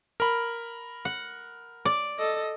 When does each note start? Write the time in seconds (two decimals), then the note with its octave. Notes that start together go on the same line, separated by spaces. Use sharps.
0.20 A#4 B5
1.05 F#5
1.85 D5
2.19 A4 D#5